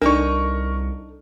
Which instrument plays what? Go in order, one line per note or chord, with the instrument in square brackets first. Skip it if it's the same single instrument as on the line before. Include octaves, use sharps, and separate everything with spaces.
[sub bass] C2 [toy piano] D4 D5 [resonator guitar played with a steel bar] D#4 A4 [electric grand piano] A#4 C#6